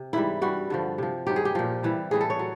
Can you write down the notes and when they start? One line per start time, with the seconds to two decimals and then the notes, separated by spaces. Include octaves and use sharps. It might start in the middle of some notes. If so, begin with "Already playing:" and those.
Already playing: C3
0.13 G#2 E3 G3 E4
0.41 G2 E3 G3 F#4
0.70 G2 D3 F3
0.98 C3 F3
1.27 G2 D#3 F#3 G4
1.36 G#4
1.45 G4
1.55 A#2 F3
1.83 C3 E3 G3
2.11 A2 E3 G3 G#4
2.21 A4
2.30 C#5
2.39 F#3